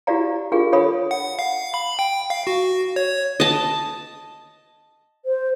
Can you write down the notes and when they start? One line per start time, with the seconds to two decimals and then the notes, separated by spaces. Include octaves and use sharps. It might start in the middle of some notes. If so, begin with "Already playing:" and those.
0.07 E4 F#4 G4 D5 F5 A#5
0.52 D4 F4 G4 G#4 A#4 F5
0.72 D4 A4 C#5 F5 B5 D#6
1.11 F#5
1.39 F5
1.74 B5
1.99 G5
2.30 F5
2.47 F#4
2.96 C#5
3.40 D#5 A5
5.25 C5